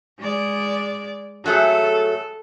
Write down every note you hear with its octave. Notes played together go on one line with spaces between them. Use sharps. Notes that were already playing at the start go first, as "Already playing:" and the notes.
G#3 D5
F#3 A3 G#4 A4